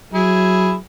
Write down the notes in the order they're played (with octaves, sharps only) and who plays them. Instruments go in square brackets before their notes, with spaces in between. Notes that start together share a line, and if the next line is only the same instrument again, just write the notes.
[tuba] F#3 [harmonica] E4 G#4